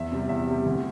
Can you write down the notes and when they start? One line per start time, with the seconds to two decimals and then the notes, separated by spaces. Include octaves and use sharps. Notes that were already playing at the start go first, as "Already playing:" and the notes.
Already playing: E2 E5
0.12 C3 G3
0.29 E2 E5
0.47 C3 G3
0.66 D2